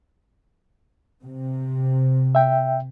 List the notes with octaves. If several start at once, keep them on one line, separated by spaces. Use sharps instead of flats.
C3
E5 G5